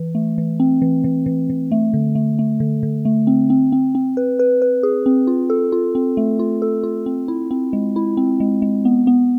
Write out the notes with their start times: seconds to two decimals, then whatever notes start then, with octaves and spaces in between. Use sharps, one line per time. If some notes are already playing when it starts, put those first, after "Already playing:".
Already playing: E3
0.15 A3
0.38 E3
0.60 C4
0.82 E3
1.04 E3
1.26 E3
1.50 E3
1.72 A3
1.94 D3
2.15 A3
2.39 A3
2.60 D3
2.83 D3
3.05 A3
3.27 C4
3.50 C4
3.72 C4
3.95 C4
4.17 B4
4.39 B4
4.62 B4
4.83 G#4
5.06 C4
5.27 F4
5.50 A4
5.72 F4
5.95 C4
6.17 A3
6.39 F4
6.62 A4
6.84 F4
7.06 C4
7.28 E4
7.51 C4
7.73 G#3
7.96 E4
8.17 C4
8.40 G#3
8.62 G#3
8.85 B3
9.07 B3